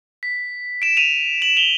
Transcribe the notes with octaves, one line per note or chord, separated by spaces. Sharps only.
B6
D7 E7
D#7 F7
E7 F#7
F7 G7